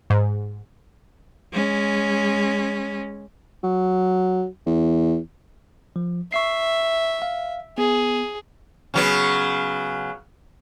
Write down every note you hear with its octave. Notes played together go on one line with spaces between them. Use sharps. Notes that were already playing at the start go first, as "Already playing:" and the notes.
G#2
G#3 C#4
F#3
E2
F3
E5 C#6 C7
F5
B3 G#4
C#3 F#3 B3